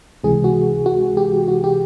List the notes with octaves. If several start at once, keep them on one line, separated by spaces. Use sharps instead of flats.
C#2 C3 E3 G#3 G#4
F#4
F#4
G4
F#4
G4